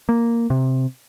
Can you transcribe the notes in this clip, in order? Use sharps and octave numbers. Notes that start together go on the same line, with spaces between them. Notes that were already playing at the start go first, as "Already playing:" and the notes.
A#3
C3